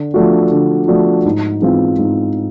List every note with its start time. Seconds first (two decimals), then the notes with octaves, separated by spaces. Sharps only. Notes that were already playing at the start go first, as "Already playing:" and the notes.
Already playing: D3
0.14 F3 A3 D4 F#4
0.51 D3
0.88 F3 A3 D4 F#4
1.25 G#2
1.62 E3 G#3 C4 F4
1.99 G#2